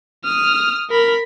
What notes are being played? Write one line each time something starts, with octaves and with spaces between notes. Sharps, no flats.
D#6 F6
A#4 B5